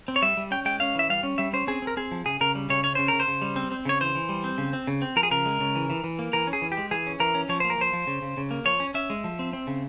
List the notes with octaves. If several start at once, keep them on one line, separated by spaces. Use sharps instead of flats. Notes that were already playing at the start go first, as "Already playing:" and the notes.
C4
C#5
G3 E5
G3
C#4 G5
G#3 G5
C#4 F5
E3 E5
G3 F5
C#4
G3 E5
C#4 C5
C4 G#4
C4
A#4
C4 G#4
F3
C#3 G#4
C#3 A#4
G3
C#3 C#5
C#4 C#5
C#3 C5
C#3 A#4
C5
C#3
G3
C4
C4
C#3 C#5
E3 C5
E3
G3
C4
C#3
C4
C#3
C4
F3 A#4
G#4
C#3 A#4
G#3
C#3
E3
E3
E3
A#3
E3 A#4
C#4
G#4
E3
G4
G#3
E3 G#4
C#4
E3 A#4
C#4
F3 C#5
A#3 C5
A#4
F3 C5
F3
C#3
C#3
C#3
A#3
F3 C#5
C#4
C#4 E5
G#3
F3
C4
C4
C#3